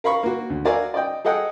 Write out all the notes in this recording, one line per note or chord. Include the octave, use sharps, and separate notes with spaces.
A#4 F5 B5 C#6
A#3 F#4
D2
F#4 A#4 D5 E5 F5 G#5
D5 D#5 G5
G#4 A4 D#5 F#5 G5